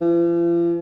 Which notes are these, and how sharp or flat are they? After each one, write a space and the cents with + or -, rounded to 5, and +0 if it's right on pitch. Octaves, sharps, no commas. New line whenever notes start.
F3 -45